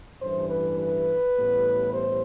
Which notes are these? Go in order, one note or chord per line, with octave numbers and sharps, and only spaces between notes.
A1 G2 E3 A3 C5
B4
B4
A1 A2 G3 B3
C5